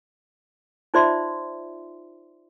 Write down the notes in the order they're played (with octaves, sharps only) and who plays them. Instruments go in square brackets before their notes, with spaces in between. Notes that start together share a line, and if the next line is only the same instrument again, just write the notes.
[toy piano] D#4 F4 C5 D5 E5 C6